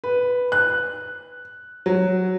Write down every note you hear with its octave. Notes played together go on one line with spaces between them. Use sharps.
B4
F#6
F#3